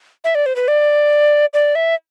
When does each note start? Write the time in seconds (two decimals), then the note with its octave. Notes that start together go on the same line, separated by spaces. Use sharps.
0.24 E5
0.35 D5
0.46 C5
0.56 B4
0.68 D5
1.54 D5
1.75 E5